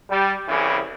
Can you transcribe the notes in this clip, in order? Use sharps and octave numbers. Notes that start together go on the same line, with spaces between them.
G3
C2 C#3 E3